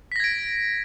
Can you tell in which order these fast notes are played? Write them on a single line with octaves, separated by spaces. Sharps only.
B6 A#6 G#6 D7